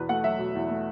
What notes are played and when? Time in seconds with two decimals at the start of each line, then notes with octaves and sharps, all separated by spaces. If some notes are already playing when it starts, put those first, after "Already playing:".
Already playing: E2 B2 B4
0.09 A3 F#5
0.24 F#3 E5
0.39 B2
0.55 E2
0.69 A3